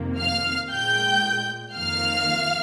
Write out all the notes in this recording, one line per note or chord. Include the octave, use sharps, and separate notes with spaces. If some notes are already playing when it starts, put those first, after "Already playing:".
Already playing: F2 C3 D#3 A#3
F5 F6
A#2 G#3 G5 G6
F2 D#3 A#3 F5 F6